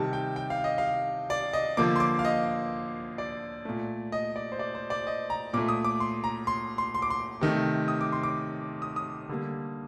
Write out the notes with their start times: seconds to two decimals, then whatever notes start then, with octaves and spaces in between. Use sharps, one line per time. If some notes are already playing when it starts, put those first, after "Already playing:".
Already playing: C3 D#3 G3 A5
0.13 G5
0.36 G5
0.50 F5
0.64 D#5
0.78 F5
1.30 D5
1.53 D#5
1.77 D3 F3 A#3 D6
1.96 C6
2.00 D6
2.19 F5
2.25 D#5
3.18 D5
3.65 A#2 A3
4.12 D#5
4.36 D5
4.52 C5
4.59 D5
4.75 C5
4.90 D5
5.07 D#5
5.30 A#5
5.53 A#2 A3 D6
5.69 D#6
5.85 D6
6.00 C6
6.24 A#5
6.47 C6
6.78 C6
6.95 C6
7.02 D6
7.10 C6
7.41 C3 D#3 A3
7.88 D#6
8.01 D6
8.12 C6
8.23 D6
8.82 D#6
8.96 D#6
9.29 D3 G3 A#3